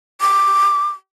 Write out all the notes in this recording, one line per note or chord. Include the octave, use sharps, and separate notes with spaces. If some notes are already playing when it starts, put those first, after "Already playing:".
D6